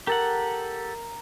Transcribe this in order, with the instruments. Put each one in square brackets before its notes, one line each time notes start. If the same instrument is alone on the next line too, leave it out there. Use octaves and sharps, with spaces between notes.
[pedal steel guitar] G4 A4 F#5 [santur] A#4